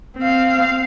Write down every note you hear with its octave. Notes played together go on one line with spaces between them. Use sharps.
C4 F5